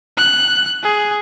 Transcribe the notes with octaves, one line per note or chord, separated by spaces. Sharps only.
F#6
G#4